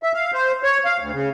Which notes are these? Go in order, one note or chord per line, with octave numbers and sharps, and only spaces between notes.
E5
F5
C5
C#5
F5
D2
C#3